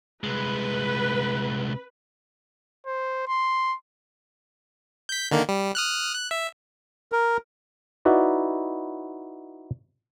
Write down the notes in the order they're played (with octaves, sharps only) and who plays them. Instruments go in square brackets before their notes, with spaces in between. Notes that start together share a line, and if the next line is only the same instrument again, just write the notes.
[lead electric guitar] C2 G#3 [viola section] B4
[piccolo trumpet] C5
C6
[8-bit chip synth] G6 B6
D3 D#3 A#3
G3
D#6 F6 F#6
F#6
E5
[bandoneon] A#4
[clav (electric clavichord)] D#4 E4 F#4 B4 D5